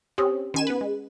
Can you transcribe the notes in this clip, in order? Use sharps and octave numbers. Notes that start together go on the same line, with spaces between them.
C4 C#4 G4 D#6
D#3 C#4 G#5 E7
B3 B4
G#3